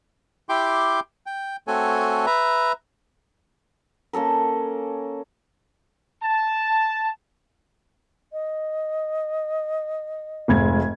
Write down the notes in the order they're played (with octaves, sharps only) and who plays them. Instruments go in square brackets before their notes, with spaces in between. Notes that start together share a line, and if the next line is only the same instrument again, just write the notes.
[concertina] E4 G4 G5 C6 D6
G5
A3 C4 F#4 A4 C#5 G#5
B4 E5 A#5
[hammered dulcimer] A#3 C#4 A4 A#4
[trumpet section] A5
[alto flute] D#5
[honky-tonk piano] F1 G#2 G#6